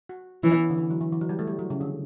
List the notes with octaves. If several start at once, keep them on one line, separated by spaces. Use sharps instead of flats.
F#4
E3 C#4
B3
D3
E3
F#3
E3
E3
F#3
G3
A3
G3
F#3
C#3
D3